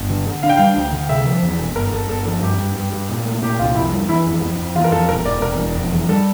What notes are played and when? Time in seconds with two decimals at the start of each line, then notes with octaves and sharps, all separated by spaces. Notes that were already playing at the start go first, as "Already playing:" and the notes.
Already playing: G1
0.10 D3
0.27 D3
0.43 D4 F5
0.49 G5
0.57 G3 F5
0.77 D2
0.92 D3
1.09 C3 E5
1.25 F3
1.43 E2
1.59 E1
1.75 G1 A#4
1.93 G1 A4
2.09 G1 A4
2.26 F3 A4
2.42 G2 G4
2.59 G2
2.76 G2
2.93 G2
3.09 A#2
3.25 A3
3.42 A#2 G4
3.59 C2 F4
3.75 F2 E4
3.92 G3
4.09 E3 E4
4.26 F2
4.42 F2
4.59 F2
4.75 E3 F4
4.84 A#4
4.92 F2 A4
5.08 E1 A#4
5.25 E1 D5
5.42 E1 A#4
5.59 E1
5.76 F2
5.92 E3
6.09 G3 A4